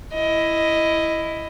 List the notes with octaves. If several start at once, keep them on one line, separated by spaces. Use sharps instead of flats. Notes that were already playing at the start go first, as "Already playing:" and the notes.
E4 D#5